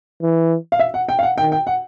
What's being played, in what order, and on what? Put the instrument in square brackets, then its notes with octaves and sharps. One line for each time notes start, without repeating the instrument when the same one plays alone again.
[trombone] E3
[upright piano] F5
E5
F#5
G5
F5
F#5
[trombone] D#3 [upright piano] G5
[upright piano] G5
F#5